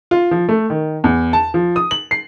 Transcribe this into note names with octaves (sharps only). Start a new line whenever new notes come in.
F4
F3
A3
D#3
E2
A5
F3
D#6
F#7
C7